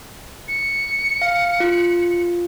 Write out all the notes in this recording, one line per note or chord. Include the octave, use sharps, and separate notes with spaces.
C#7
F5
F4